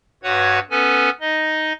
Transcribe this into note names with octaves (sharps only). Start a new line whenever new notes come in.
G2 F#4 B4 C#5 F#5 G#6
B3 C#4 A4 B4 G#5
D#4 D#5